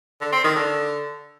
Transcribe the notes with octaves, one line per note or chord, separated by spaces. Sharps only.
D3
C4
D#3
D3